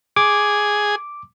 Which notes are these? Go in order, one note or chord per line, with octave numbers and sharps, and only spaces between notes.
G#4 D6